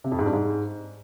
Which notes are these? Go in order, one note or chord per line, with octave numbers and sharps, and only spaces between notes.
C3
F2
G#2
G2
G#2